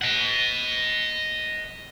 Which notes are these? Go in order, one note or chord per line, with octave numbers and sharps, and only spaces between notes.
D#5 F#5